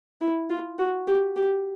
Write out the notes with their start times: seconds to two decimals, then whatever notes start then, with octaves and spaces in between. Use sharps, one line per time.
0.21 E4
0.50 F4
0.79 F#4
1.07 G4
1.36 G4